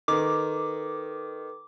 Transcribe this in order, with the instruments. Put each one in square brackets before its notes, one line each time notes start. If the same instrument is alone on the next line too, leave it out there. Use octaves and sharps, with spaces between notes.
[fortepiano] D#3 [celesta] A4 B4 [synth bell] D6